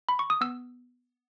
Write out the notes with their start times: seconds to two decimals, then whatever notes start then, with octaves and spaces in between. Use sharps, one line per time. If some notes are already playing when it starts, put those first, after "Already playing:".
0.09 B5
0.19 C#6
0.30 D#6
0.41 B3 E6